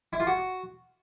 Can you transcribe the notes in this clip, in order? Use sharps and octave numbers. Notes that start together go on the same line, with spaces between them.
E4
F4
F#4